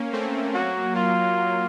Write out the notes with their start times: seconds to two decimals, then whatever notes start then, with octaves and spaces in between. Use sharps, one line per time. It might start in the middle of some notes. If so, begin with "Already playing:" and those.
Already playing: A#3 C#4
0.12 A3 C4
0.54 F#3 A#3 F#4
0.95 F#3 F4